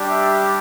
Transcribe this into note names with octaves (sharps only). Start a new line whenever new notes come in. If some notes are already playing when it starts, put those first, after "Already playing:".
Already playing: G3 D4 G4
E5